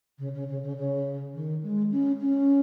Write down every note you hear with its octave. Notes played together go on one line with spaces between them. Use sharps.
C#3
C#3
C#3
C#3
C#3
D#3
G#3
C#4
C#4